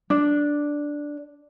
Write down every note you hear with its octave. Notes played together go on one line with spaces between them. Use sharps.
D4